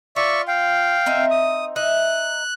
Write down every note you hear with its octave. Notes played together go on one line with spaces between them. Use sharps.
F4 D5 E5 C#6
F5 G5
C4 D#4 E5
D#6
D#4 E5 F#6